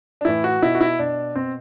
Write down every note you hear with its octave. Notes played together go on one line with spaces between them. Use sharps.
D4
A2 E3 E4
F#4
B2 E4
F#4
E4
B2 D4
B2 C4